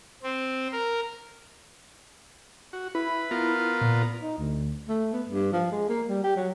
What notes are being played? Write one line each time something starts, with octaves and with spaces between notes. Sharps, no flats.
C4
A#4
F#4
E4 B4
B3 F4 A#4
A#2
D#4
D2
A3
B3
G2
F3
G#3
A#3
G3
G4
F#3